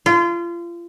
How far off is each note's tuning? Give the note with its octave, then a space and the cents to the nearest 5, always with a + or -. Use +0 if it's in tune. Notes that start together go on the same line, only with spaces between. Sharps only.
F4 -30